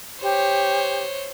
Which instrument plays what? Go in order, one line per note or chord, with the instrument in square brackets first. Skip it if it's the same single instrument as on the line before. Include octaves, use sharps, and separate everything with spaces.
[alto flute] G4 [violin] C5 C#5